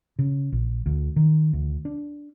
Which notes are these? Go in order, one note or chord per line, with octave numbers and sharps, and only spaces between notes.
C#3
A#1
D2
D#3
D2
D4